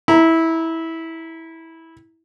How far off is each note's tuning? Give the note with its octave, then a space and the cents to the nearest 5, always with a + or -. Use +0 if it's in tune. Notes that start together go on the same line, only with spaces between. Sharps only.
E4 -15 A#5 +10